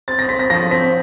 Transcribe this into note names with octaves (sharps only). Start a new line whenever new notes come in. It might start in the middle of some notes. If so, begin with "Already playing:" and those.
C4 A6
A#6
C4 B6
A#6
F3 A#6
C4 B6